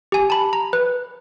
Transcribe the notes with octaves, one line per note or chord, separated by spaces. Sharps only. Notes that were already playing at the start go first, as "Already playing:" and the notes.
G4 G#5
A5 B5
A#5
B4